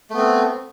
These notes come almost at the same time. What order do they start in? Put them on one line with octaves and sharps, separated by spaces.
A3 B3 C4